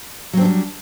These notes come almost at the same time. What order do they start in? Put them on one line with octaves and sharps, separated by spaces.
F#3 C4 D4 G3